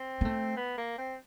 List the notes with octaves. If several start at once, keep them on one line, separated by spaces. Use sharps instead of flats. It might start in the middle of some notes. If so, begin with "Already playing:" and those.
Already playing: C4
A#3
A3
B3
A#3
C4